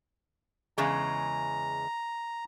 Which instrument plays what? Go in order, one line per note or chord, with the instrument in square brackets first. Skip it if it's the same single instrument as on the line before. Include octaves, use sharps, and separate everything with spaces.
[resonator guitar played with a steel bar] E2 C#3 G#3 [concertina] A#5